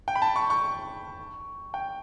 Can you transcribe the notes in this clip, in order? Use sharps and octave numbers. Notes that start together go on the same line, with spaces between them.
G5
B5
A5
C#6
C#6
G5